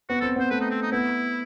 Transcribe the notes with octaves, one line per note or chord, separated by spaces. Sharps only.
B3 F#4
C4 A4
B3 C5
A3 B4
D#4
C4
D#4
B3 E4